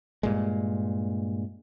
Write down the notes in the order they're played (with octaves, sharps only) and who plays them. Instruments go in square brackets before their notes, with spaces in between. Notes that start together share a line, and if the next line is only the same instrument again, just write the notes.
[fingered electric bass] G2 A#2 G#3